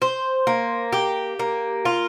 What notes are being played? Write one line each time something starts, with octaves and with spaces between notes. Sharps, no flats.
C5
A#3
G4
A#3
F4